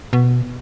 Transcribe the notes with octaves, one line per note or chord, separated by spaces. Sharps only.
B2